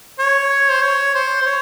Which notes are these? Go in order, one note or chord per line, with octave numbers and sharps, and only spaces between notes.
C#5
C5
C#5
C5
C5
C#5